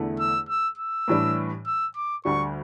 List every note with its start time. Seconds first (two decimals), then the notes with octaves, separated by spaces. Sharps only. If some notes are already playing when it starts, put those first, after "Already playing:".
Already playing: E2 D3 A3 E4
0.20 E6
0.49 E6
0.78 E6
1.08 A2 E3 G3 D4
1.66 E6
1.96 D6
2.25 D2 D3 G3 C#6